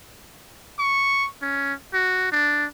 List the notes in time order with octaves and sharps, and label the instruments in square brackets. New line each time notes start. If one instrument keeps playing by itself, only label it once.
[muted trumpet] C#6
C#4
F#4
D4